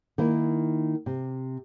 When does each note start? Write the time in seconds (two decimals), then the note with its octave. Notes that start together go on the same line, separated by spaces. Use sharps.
0.18 D#3 A#3 E4
1.06 C3